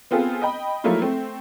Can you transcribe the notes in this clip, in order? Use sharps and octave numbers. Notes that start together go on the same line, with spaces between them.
B3 C4 F4 G#4 A4
D#5 G5 B5
F3 F#3 A3 A#3 E4 F4
A3 C4